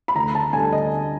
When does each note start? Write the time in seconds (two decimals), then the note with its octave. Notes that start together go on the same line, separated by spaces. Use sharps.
0.08 B5
0.15 D2 A#5
0.35 A5
0.53 D3 G3 G#5
0.73 D#5